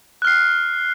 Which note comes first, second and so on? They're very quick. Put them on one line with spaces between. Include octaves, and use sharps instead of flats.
F#6 F6 C7